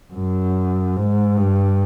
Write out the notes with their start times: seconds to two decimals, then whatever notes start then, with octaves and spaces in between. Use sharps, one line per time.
0.14 F#2
0.96 G#2
1.37 G2